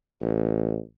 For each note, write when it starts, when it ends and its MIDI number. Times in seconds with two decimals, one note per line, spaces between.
0.21 0.78 33